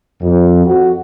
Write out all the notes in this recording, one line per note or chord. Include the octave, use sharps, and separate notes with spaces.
F2
F#4